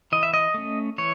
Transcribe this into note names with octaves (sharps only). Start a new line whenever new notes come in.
E3 D#5
E5
D#5
A3 C#4
E3 C#5